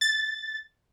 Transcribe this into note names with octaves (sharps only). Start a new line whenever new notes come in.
A6